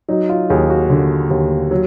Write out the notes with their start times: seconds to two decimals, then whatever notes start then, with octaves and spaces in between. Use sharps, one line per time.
0.09 F#3 D#4
0.29 F4
0.50 D#2 G#4
0.70 F#4
0.90 D3
1.31 D#2
1.71 F#3